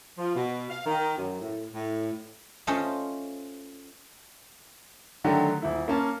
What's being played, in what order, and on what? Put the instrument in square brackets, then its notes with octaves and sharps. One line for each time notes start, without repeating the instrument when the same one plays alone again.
[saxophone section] F3
B2
F5
D#3
F#2
A2
A2
[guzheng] A3 C#4 F4 C5 D#5 A5
[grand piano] D3 D#3 F#3 A3 G4
D#1 E4
A#3 C#4 A5